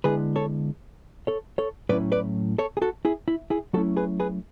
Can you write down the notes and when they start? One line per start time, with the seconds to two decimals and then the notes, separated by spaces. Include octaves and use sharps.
0.04 D3 G#3 B3 E4 G#4 B4
0.36 A4 C#5
1.27 A4 C#5
1.58 A4 C#5
1.89 A2 F#3 C#4 E4 B4 D5
2.12 B4 D5
2.58 A4 C#5
2.77 G#4
2.82 F#4 A4
3.05 E4 G#4
3.28 E4
3.50 E4 G#4
3.73 F#3 A3 C#4 E4 F#4 A4
3.97 G#4 B4
4.20 G#4 B4